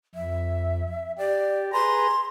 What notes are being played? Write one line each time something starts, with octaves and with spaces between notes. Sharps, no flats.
F2 E5
G4 D5
G#4 B4 A#5 C6